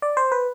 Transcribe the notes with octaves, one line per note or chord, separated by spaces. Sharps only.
D5
C5
B4